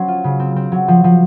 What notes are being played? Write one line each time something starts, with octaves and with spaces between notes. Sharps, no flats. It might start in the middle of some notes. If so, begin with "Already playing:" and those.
Already playing: F#3 C#4 C5
F4
C#3
C4
C4
F#3
F3
F3